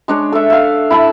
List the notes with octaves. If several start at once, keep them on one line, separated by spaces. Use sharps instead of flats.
G#3 D4 C#5
A4 E5
E5 F5
E4 A5 B5